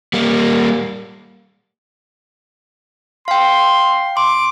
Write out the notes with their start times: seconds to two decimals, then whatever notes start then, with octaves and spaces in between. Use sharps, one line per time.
0.13 G3 A#3
3.28 F5 G5 C6
4.17 C6 D6